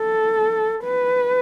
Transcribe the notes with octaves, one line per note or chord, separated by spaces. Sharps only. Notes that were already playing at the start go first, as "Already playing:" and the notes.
Already playing: A4
B4